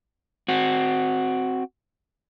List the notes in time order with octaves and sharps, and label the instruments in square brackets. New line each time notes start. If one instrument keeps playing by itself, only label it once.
[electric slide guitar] C4 F#4